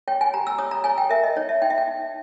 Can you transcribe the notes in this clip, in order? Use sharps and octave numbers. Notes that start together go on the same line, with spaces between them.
C#5 G5
G#5
G4 A#5
E6
C#5 D#6
A#5
C#5 G#5
G5
A#4 E5
D#5
D#4 C#5
E5
D#4 G5
E5
G5
D#4